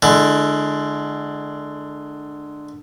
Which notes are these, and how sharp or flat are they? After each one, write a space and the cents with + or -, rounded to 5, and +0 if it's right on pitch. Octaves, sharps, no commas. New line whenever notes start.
D3 +15 G#3 +35 E4 +25